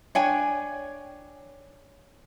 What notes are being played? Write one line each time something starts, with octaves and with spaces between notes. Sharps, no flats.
D4 C#5 G5 G#5